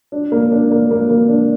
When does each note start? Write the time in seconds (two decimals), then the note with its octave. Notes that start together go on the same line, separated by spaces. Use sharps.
0.12 D4
0.32 A#3
0.51 D4
0.71 A#3
0.91 A#3
1.10 A#3
1.29 D4